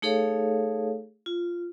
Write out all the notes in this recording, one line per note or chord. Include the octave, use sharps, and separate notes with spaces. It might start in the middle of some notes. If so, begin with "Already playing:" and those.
A3 D#4 G#4 A4 C#5 F5
F4